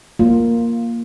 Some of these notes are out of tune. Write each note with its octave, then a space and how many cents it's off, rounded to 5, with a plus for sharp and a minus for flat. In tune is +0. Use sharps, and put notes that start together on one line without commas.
A#3 +0 F4 +0